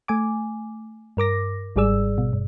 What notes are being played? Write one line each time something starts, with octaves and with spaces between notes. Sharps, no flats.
A3 G#5 D6
G2 A#4 D6 A#6
G#1 G#2 G3 G#4 D5 E6
B2
G2